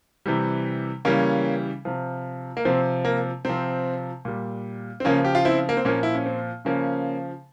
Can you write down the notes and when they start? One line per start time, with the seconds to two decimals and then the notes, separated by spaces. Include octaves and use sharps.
0.26 C3 E3 G3
1.05 C#3 E3 G3 A#3 C#4
1.85 C3 F3
2.57 A#3
2.65 C3 F3 C4
3.05 A#3
3.45 C3 F3 C4
4.25 A#2 G3
5.00 C4
5.05 C#3 F3 A#3 C#4
5.25 G4
5.35 F4
5.45 C4 E4
5.69 A#3
5.77 C4
5.85 A#2 F3 A#3 C#4
6.03 E4
6.15 C#4
6.26 C4
6.65 C#3 F3 A#3 C#4